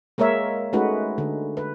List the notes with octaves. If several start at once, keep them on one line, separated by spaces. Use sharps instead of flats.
G#3 A#3 A#4 C#5 E5
G#3 A3 C#4 D#4 F#4 B4
D3
B4